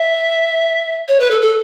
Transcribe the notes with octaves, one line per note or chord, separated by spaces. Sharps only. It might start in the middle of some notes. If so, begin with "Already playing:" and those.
Already playing: E5
C#5
B4
A4
A4